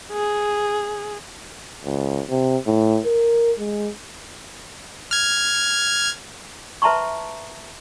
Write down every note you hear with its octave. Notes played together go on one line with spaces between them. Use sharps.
G#4
C#2
C3
A2
A#4
G#3
F6 G#6
B4 E5 A5 A#5 C6 C#6